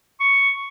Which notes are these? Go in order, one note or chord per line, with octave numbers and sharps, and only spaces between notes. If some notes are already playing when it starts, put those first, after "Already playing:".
C#6